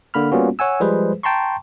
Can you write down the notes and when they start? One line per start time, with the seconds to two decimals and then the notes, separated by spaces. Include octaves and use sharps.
0.14 D3 A#3 B5 F6
0.32 G3 A#3 B3 C#4 F4 F#4
0.59 C#5 F#5 G#5 E6
0.80 F3 G3 G#3 G#4 B4 C5
1.23 G5 A5 A#5 C6 C#6